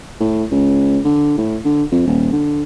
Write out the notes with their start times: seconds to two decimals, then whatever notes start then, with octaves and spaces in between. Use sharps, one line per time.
0.20 A2
0.51 C#2
1.05 D3
1.38 A2
1.65 D3
1.92 F2
2.07 D#1
2.32 D3